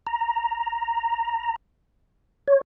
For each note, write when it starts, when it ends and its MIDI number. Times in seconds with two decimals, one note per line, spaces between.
0.07 1.56 82
2.48 2.61 73